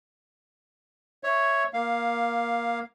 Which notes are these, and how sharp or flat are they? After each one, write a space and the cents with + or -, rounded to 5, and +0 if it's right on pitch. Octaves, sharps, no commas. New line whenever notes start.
C#5 +0 E5 +5
A#3 +15 F5 +0